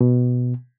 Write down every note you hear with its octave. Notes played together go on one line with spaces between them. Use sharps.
B2